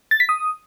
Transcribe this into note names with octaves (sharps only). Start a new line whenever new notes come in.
A6
B6
D#6